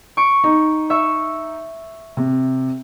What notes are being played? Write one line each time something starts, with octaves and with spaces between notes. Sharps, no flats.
C#6 D7
D#4
E5 C#6
C3